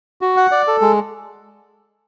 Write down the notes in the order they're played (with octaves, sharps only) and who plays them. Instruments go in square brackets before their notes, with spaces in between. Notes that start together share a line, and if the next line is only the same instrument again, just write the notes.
[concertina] F#4
F#5
D5
A4
G#3